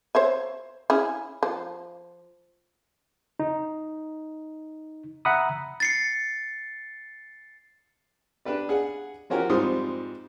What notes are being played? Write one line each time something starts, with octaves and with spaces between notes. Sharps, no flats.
C5 C#5 E5
C#4 E4 G#4
F3
D#4
E5 F#5 A#5 B5 D#6
A6 C7 C#7
D4 G4 B4 D5
G#4 F#5
E3 F3 C#4 F#4 G4 A#4
F2 G#2 F3 G3 D#6